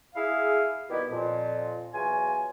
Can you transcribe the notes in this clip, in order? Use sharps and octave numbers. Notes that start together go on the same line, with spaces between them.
E4 G#4 F5
B2 D#3 G3 B3 E4 G4
F2 A#2
E2 F#3 F4 G#5